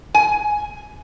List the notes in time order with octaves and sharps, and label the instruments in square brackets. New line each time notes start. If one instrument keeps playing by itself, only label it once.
[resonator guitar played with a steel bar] G#5